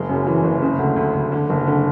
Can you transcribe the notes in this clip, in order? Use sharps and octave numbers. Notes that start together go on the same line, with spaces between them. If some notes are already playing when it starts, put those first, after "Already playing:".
Already playing: F#1 G#3
F#2
E3
F#1
C#3
D2
D2
D2
D3
F#1
D3